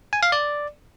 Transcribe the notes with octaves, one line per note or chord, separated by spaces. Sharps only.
G#5
F5
D5